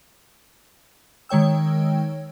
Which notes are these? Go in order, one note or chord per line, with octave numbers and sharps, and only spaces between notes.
D#3 G#3 C#5 G5 E6